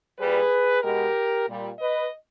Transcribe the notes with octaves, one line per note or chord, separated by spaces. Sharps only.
A#2 G3 G#4 B4
B2 G#3 G4 A#4
A#2 G3
B4 D#5